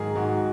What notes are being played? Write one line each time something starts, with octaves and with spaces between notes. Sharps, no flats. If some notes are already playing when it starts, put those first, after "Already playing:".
Already playing: G#2 D#3 F#3 G#4 A#4
G#2 F#4